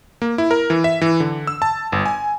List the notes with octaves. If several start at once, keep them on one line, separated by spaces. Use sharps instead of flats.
A#3
E4
A#4
E3
E5
E3
D3
E6
A5
G1
G#5